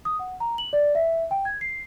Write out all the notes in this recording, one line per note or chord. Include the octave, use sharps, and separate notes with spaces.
D#6
F#5
A#5
F#7
D5
E5
G5
G#6
C7